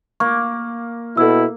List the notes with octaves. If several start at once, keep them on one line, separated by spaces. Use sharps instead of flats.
A#3 C#6
B2 E4 A4 E6